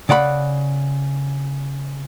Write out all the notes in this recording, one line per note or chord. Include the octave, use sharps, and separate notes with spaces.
C#3 D5 F#5 B5